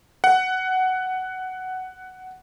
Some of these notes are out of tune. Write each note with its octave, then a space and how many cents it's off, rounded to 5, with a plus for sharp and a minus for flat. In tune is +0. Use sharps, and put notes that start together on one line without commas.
F#5 +10